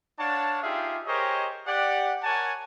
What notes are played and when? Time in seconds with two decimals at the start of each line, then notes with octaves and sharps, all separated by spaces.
0.19 D4 C#5 F5 F#5 A5
0.63 D#4 F4 G4 G#4 E5 F5
1.06 G4 G#4 A#4 C5 C#5 D#5
1.67 G4 D5 F#5
2.24 A#4 C#5 F#5 G#5 A5